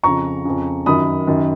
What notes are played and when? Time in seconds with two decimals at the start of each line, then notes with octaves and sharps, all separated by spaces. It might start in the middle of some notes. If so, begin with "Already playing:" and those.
0.03 F2 C#3 A#5 C#6
0.45 F2 C#3
0.86 F#2 D#3 B5 D#6
1.27 F#2 D#3